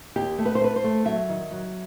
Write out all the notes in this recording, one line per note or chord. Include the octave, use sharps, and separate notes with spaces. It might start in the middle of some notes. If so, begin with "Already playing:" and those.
D#2 G4
A3
B4
C5
A3 B4
C5
A3
F#3 E5
D#3
F#3